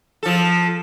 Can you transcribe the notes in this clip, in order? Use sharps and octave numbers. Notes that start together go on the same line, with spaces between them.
F3 A4